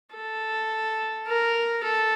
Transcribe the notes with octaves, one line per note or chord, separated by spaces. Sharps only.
A4
A#4
A4